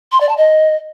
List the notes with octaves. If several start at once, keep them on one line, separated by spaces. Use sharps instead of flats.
C6
D5
A5
D#5